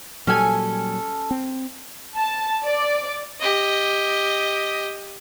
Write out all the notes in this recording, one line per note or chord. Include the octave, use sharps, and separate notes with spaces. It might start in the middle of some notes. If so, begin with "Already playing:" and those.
A#2 F#3 G3 C#4 A4 G#5
C4
A5
D5
G4 D#5